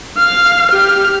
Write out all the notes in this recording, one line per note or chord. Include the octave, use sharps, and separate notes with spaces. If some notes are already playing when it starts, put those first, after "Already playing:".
F5 F6
G4 F6